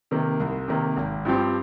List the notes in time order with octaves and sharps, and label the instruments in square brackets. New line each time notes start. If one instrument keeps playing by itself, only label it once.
[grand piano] C3 D#3 A#3
C2
C3 D#3 A#3
G#1
G2 F3 C4 G4